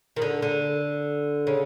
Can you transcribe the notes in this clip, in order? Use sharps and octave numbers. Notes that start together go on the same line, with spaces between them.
D#3
D3
D3
C#3